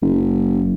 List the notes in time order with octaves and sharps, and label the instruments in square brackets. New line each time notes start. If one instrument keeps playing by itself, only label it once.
[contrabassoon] F#1